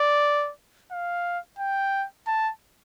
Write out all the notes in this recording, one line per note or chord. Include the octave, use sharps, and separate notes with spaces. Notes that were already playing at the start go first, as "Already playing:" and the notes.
Already playing: D5
F5
G5
A5